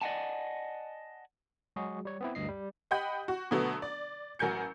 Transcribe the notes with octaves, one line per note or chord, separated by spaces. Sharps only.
D5 D#5 F5 F#5 G#5 A5
F#3 G#3 F#4 G#4
G3 C#5
B3 C4 E4
D2 G2 D#5 C7
G3
G4 D#5 F#5 G5 B5 G6
F#4
B2 D3 F#3 A3 B3
D5
A1 F#3 A#4 G#5 G6 C#7